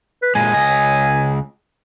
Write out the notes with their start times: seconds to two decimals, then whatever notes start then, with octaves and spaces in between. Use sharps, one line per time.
0.22 B4
0.35 A#2 G#3 G#5
0.54 C#2 D#5